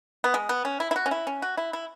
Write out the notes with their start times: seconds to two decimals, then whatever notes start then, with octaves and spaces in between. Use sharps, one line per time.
0.24 B3
0.34 G#3
0.49 B3
0.65 C#4
0.80 E4
0.91 E4
0.96 F#4
1.06 C#4
1.11 E4
1.27 C#4
1.42 F#4
1.57 E4
1.73 E4